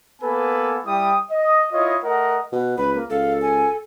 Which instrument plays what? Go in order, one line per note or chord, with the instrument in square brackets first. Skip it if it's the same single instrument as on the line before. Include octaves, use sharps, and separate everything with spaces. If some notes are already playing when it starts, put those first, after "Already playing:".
[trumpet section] A#3 B3 A4 B4 G#5
G3 E4 G5 D#6
D#5
E4 F4 C#5 D#5
A3 A#4 D#5 F#5
[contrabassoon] B2 [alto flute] B4
[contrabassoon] C#2 [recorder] B4 [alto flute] B5
[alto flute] A#3
[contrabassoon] C#2 [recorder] A4 [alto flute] F5
[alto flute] G#5